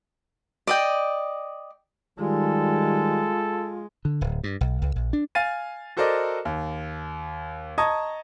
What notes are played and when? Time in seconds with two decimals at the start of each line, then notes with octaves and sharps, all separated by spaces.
0.67 D5 D#5 G5
2.19 D#3 G3 G#3 F4 A4
4.05 D3
4.21 D1
4.44 G2
4.61 B1
4.82 C#2
4.96 A#1
5.13 D4
5.35 F5 G#5 A6 D#7
5.97 F#4 A4 A#4 C5 D5 D#5
6.45 D#2
7.78 D#5 A5 A#5 C#6 D#6 G#6